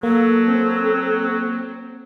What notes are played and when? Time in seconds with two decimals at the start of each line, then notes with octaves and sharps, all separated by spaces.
0.03 F#3 A#3 A4
0.48 C4